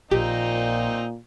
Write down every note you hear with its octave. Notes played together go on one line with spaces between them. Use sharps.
A#1 A#2 C4 D#4 G4 A#5